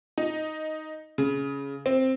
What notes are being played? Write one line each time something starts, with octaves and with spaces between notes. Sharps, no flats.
D#4
C#3
C4